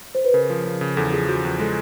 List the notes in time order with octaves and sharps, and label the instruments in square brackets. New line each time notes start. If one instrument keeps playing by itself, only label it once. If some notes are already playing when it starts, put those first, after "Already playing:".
[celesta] C5
B4
[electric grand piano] C#3 [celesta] A#4
[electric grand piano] F3
C#3
C#3
[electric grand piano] E2 [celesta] A4
[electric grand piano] F3 [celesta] G#4
[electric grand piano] F3 [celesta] F#4
[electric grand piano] E2
[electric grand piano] G#3 [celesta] A4